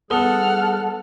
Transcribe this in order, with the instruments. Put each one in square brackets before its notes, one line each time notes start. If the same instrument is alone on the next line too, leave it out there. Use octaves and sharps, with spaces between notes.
[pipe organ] G3 G#4 [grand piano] B3 D#6 G7 [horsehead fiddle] A4 [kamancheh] F#5 F6